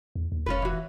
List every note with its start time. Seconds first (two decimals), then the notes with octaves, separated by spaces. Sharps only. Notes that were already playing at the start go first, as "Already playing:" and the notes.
0.15 E2
0.32 D#2
0.46 F1 C#4 F4 B4
0.62 E3 F#4